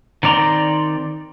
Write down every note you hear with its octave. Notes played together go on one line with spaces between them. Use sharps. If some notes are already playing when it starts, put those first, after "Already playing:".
D#3 C4 D5 A#5 C6